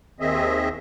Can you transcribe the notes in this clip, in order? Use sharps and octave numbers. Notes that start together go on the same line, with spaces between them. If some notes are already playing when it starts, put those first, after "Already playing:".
D#2 D#3 C4 G#4 D#5 E5